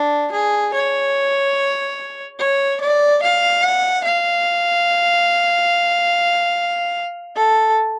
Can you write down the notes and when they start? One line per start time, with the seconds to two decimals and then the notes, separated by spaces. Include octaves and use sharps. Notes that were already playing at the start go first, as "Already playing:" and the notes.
Already playing: D4
0.32 G#4
0.74 C#5
2.39 C#5
2.81 D5
3.23 F5
3.63 F#5
4.04 F5
7.36 A4